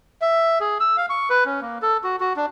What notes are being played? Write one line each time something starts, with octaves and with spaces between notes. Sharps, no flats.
E5
G#4
E6
F5
C#6
B4
C#4
A#3
A4
F#4
F#4
D4